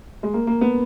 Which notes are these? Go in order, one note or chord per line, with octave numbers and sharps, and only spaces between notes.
G#3
A#3
A#3
B3